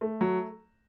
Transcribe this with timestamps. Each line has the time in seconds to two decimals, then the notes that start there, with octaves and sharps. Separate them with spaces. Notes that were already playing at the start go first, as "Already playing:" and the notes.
0.01 A3
0.21 F#3